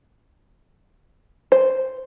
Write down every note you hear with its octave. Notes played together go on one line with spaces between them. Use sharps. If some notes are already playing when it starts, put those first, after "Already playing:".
C5